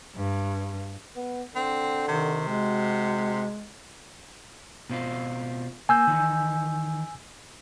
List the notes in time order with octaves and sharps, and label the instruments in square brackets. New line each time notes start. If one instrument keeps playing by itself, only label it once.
[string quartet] G2
[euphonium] B3
[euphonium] D3 [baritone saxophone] C4
[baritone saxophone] C3 [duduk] D#3
[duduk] G#3 [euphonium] F#4
[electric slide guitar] B2 C4 F4
[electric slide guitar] A#3 [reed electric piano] G#5 E6 G6
[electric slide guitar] D#3 E3